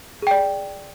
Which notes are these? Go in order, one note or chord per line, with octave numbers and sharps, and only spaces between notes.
G#4 D5 G5